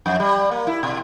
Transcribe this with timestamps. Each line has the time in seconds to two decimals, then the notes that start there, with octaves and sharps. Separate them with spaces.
0.06 F2
0.20 G3
0.51 A#3
0.67 E4
0.83 B2